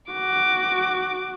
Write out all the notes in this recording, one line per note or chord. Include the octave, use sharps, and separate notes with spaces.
F#4 D6